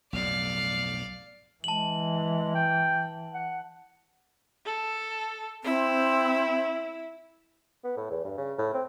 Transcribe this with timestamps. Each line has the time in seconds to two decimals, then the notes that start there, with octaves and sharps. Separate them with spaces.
0.13 B1 F2 A2 D5 F5
1.64 E3 G#3 A5 F#7
2.55 G5
3.34 F#5
4.66 A4
5.64 C4 E4
7.84 B3
7.97 A2
8.11 E2
8.24 G2
8.38 C#3
8.58 A2
8.74 C4